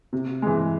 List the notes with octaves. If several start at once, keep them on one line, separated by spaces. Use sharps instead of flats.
C3
E3 G#3